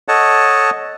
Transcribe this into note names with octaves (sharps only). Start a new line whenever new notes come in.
A4 C#5 D#5 F#5 A5